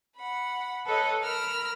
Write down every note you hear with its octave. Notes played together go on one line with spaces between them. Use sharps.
F#5 B5
A4 B4 C#5 D#5
A#4 A#5 B5 E6 F6